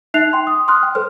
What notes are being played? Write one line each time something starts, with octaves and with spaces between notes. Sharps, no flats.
D#4 E5 F#6 C7 F7
G5 C6
D#6
C6 D#6 F6 F#6
G5
A4 B4 C5 F6